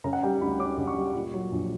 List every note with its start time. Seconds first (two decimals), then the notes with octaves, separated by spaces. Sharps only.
0.04 C#3 A#5
0.13 F#5
0.23 G3 G5
0.41 D2 B5
0.59 C#4 D6
0.78 C#3
0.87 C#6
0.96 G3
1.15 A#2
1.34 F#3
1.52 A#1